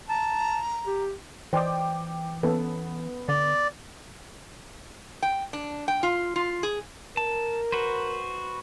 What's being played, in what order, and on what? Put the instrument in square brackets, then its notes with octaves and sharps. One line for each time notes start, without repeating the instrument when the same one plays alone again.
[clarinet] A5 [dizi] A#5
[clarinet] G4
[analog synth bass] E3 [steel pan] C5 D5 D#5 [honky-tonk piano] G5 D6
[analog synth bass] E3 [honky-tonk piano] B3 [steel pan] C#4 A4 B4
[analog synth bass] D3 [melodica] D5
[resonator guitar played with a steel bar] G5
D4
G5
F4
F4
G#4
[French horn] A#4 [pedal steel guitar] A5
[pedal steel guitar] F#4 B4 C5